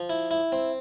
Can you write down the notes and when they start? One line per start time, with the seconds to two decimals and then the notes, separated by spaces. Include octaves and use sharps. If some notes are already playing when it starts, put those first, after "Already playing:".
Already playing: F3
0.10 E4
0.31 E4
0.52 C4